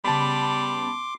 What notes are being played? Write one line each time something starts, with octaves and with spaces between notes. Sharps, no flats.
C#3 G3 B3 A5 B5 C6 D6